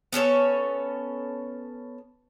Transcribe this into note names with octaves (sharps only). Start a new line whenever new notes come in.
B3 C#4 A4 C#5